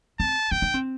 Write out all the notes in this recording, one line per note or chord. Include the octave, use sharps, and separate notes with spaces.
C4 A5
C4 G5
D4
C4